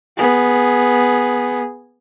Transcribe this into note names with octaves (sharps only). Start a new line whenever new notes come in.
B3 G#4